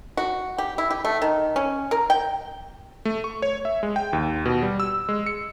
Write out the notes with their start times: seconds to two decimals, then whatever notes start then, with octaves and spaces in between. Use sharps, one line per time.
0.17 F#4
0.58 G4
0.78 E4
0.91 G4
1.05 A3
1.22 D#3
1.56 C#4
1.91 A#4
2.10 G5
3.05 A3
3.24 C#6
3.42 C#5
3.65 E5
3.83 G#3
3.96 G5
4.13 D#2
4.45 B2
4.62 G3
4.80 E6
5.09 G#3
5.26 C#7